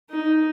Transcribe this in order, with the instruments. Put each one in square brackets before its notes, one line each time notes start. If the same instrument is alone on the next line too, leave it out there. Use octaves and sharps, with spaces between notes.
[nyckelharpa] D#4